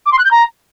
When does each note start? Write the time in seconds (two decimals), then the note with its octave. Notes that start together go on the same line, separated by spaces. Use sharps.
0.06 D6
0.12 C6
0.18 F#6
0.25 G6
0.31 A#5